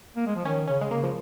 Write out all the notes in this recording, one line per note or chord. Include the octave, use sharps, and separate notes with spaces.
A#3
G#3
F3
D#3 C#4
C#3 C#4
G#3
C#3 A#3
F3